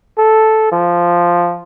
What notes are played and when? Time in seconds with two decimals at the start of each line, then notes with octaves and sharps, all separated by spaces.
0.18 A4
0.72 F3